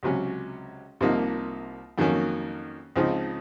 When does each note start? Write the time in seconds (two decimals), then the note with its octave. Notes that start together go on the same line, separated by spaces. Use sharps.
0.03 C#2 C3 F#3 C#4
1.01 C2 C3 F3 A#3 D#4
1.98 F2 D#3 F#3 A#3 C#4
2.96 C#2 C#3 F3 C4 D#4